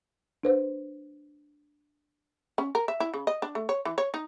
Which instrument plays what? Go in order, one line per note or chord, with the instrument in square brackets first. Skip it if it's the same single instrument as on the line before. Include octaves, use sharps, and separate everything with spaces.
[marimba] D4 B4 C5
[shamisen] C#4
A#4
E5
E4
C#3
D#5
D4
A3
C#5
E3
C#5
D#4